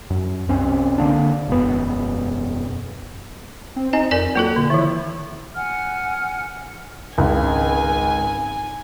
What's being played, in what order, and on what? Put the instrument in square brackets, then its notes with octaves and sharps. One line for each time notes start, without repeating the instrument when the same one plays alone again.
[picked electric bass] F#2
C2 C4 C#4
D3 A#3 D4
E1 F#2 B3
[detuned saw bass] C4
[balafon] C4 D#5 G#5 [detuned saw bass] D#4
[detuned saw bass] F2 [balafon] A#4 D5 G#5
[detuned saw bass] F#3 [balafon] A#3 F4 A4
[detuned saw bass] A#2 [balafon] D3
[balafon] D#3 E3 [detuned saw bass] E4
[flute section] F#5 G#5 F6
[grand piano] G#1 C#2 [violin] G#5